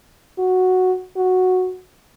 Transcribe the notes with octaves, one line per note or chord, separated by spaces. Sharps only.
F#4
F#4